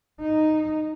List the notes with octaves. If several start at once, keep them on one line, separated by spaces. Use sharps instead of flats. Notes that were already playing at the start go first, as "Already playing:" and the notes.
D#4